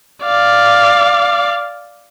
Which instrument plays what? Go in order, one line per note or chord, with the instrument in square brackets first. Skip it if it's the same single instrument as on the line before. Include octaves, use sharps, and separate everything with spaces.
[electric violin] D5 F5